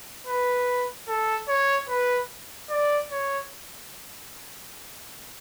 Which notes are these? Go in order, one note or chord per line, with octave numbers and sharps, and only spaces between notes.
B4
A4
C#5
B4
D5
C#5